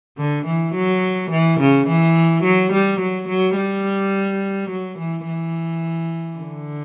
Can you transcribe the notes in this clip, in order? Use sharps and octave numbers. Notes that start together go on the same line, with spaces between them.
D3
E3
F#3
E3
C#3
E3
F#3
G3
F#3
F#3
G3
F#3
E3
E3
D3